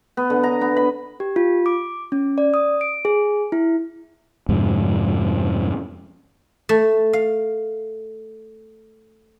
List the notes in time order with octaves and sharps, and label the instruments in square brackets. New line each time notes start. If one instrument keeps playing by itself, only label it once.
[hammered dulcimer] B3
D3
A#5
B3
B5
[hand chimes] G4
F4
D6
C#4
D5
D#6
D7
G#4
E4
[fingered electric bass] F2 G#2 C3
[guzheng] A3
F5